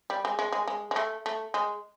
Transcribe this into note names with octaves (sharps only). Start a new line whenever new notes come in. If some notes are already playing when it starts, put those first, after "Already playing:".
G3
G#3
G#3
G#3
G#3
G#3
A3
A3
G#3